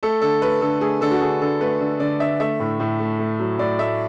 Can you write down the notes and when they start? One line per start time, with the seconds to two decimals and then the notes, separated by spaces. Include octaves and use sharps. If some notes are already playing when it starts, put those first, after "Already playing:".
0.03 A3 A4
0.22 D3 A4
0.42 A3 B4
0.61 D3 A4
0.81 A3 G#4
1.01 D3 A4
1.11 F#4
1.21 D3 G#4
1.41 D3 A4
1.60 A3 B4
1.80 D3
2.00 D3 D5
2.19 D3 E5
2.40 A3 E5
2.60 A2
2.80 A2
3.00 A3
3.19 A3
3.39 F#3
3.59 A2 D5
3.78 A3 E5